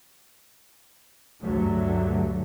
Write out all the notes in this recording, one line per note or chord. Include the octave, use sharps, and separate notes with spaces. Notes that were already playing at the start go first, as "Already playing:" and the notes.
D2 G2 D3 F#3 A3